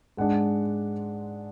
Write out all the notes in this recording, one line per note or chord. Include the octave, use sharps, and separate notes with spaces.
G#2 G#3 D4 F#5